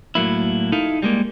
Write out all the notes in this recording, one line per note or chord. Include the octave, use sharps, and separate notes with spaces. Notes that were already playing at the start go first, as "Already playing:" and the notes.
A2 F#3 A#3 E4
D#4 E4 A4 F5
G3 G#3 A#3